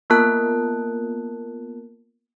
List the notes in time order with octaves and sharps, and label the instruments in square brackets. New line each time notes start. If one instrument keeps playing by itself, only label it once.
[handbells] A#3 B3 F4 A#4 A5 F#6